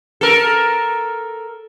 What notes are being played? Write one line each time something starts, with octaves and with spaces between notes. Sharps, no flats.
A4 A#4